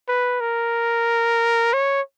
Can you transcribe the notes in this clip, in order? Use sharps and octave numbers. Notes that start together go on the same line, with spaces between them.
B4
A#4
C#5